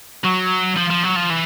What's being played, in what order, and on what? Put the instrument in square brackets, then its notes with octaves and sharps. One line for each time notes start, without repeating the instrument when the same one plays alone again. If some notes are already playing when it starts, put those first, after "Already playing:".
[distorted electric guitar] F#3
F3
F3
F#3
F3
E3